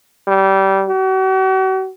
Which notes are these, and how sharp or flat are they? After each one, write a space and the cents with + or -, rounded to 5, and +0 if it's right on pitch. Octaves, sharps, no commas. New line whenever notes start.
G3 -20
F#4 +40